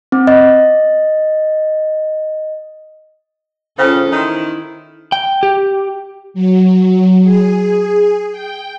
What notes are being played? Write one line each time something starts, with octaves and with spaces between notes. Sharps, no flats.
C4
D#5
C#3 C#4 F4 A4 C5 F#5 G5
D#3 E4 A#5 C6
G5
G4
F#3
G#4
G5